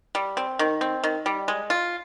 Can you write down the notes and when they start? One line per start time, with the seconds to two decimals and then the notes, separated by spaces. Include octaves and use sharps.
0.15 G3
0.37 C4
0.59 D#3
0.81 C4
1.04 D#3
1.26 G3
1.48 G#3
1.70 F4